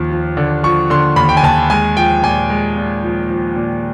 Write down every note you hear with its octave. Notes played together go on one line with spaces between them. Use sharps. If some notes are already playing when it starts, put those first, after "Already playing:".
Already playing: D#2 F3
F3
D3
F3 C#6
D3 C6
D#2 B5
G5
G#5
D#2 A5
G#3 G#5
F3 G5
A#2 G#5
G#3
A#2
F3
F3
A#2